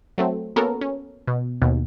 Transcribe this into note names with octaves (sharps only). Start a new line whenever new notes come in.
F#3 A3 C4
A#3 B3 C#4 F#4 A4 A#4
C#4
B2
D#2 B2